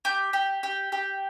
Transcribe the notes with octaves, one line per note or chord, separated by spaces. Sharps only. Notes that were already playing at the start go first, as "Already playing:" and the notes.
G4 G6
G4
G4
G4